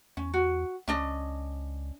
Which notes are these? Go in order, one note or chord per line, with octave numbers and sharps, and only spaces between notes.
E2 C#4
F#4
C#2 C#4 D4 D#5